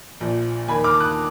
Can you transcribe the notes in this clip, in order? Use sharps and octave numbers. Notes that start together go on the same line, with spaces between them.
A#1 A#2 F3
D#2 D#3 G#5 B5
D6 F6
D#6 F#6